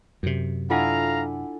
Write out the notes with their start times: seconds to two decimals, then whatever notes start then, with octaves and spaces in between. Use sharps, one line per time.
0.23 F#2 C3
0.70 D4 E4 F4 A4 F5 F#5 G#5 A#5